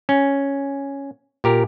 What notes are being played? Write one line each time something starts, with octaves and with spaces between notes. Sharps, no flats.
C#4
A#2 G4 A#4